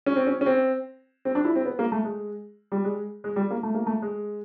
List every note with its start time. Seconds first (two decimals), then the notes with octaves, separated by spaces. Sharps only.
0.06 C#4
0.16 C4
0.27 C#4
0.41 C#4
0.46 C4
1.25 C4
1.35 D4
1.45 E4
1.56 C4
1.65 B3
1.79 A#3
1.92 A3
2.05 G#3
2.72 G3
2.84 G#3
3.24 G#3
3.36 G3
3.51 A#3
3.63 A3
3.75 A#3
3.87 A3
4.02 G#3